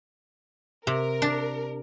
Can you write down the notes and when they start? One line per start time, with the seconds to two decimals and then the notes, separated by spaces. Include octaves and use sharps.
0.87 C3 A#4
1.22 D4